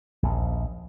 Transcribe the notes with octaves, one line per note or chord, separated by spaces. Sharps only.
A#1 D#2